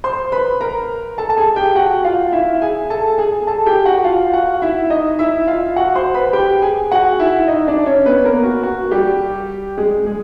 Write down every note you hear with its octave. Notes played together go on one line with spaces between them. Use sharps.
C5 C6
B4 B5
A#4 A#5
A4 A5
A5
G#4 G#5
G4 G5
F#4 F#5
F4 F5
E4 E5
G#4 G#5
A4 A5
G#4 G#5
A4 A5
G4 G5
F#4 F#5
F4 F5
F#4 F#5
E4 E5
D#4 D#5
E4 E5
F4 F5
F#4 F#5
C5 C6
B4 B5
G4 G5
G#4 G#5
F#4 F#5
E4 E5
D#4 D#5
D4 D5
C#4 C#5
B3 B4
A#3 A#4
F#4
F#4
G3 G4
G#3 G#4
G#3 G#4